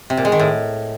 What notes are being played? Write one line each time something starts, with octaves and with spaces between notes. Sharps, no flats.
C3
A#2
G#3
D#3
A2